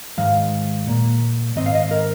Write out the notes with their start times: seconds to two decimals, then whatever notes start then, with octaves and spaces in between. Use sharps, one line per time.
0.17 G#2 D#3 G#3 F5
0.87 A#2 A#3
1.56 G#2 D#3 C4 D#5
1.66 F5
1.75 D#5
1.91 A#4